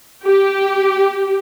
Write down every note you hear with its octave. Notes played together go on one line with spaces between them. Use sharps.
G4